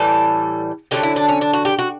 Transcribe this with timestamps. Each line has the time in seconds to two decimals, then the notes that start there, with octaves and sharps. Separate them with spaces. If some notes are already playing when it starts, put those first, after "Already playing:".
Already playing: A2 E3 G3 A4
0.91 D3 F#3 A3 G4
1.03 E4
1.16 D4
1.28 C#4
1.41 D4
1.53 F#4
1.65 G4
1.79 F#4